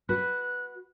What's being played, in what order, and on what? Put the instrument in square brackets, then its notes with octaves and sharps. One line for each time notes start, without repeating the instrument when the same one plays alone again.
[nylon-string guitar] F#4 B4 [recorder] F#6